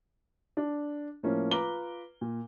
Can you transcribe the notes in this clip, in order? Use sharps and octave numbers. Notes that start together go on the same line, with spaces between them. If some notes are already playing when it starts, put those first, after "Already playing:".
D4
A2 F3 A#3 C#4
F4 B4 A#5 D6 G7
A#2